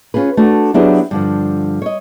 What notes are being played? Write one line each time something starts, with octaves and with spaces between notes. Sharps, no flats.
C#4 F4 G#4 B4
A3 D4 F#4
F#3 B3 D4 E4 G4 G#4
G2 D3 F3
C#5 D#5